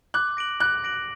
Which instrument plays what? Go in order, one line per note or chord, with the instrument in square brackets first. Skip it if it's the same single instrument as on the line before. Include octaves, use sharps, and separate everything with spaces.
[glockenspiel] D6 [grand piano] F#6
[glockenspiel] A#6 D7 F#7
[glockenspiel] D6 [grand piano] F#6
[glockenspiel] A#6 D7 F#7